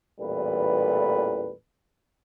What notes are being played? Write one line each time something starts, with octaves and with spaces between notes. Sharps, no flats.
A1 E2 A#2 G3 A4 B4